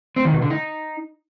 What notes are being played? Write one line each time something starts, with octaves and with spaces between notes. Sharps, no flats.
C4
D#3
B2
D3
D#4